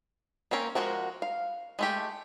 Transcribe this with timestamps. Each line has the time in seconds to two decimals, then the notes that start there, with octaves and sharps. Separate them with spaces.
0.51 A#3 C4 C#4 A#4
0.75 F3 F#3 G#3 F#4 A#4
1.22 F5
1.79 G#3 A3 G4